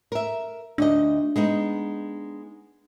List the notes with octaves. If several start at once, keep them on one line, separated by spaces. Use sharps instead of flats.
A#4 E5
D2 D4 D#4 D#5
G#3 B3 D#4